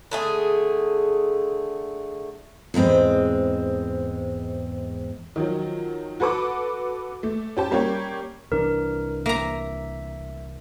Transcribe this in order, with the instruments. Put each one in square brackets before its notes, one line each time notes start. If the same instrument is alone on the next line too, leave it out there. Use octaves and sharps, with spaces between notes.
[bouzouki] D3 A3 G#4
[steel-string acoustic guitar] E2 G#2 G#3 C4
[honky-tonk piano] D#3 F3 F#3
F#4 A4 B4 A5 D6
A3
C#4 G4 A5
G3 A#3 C#4 G4 C#5
[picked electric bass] C2 E3 D4 [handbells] A#4
[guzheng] A#3 A#5 [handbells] E5